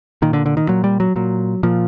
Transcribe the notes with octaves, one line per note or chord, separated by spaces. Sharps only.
A#2 D#3
D3
D3
D#3
A#2 F#3
G3
F#3
A#2 F#3
A#2 F3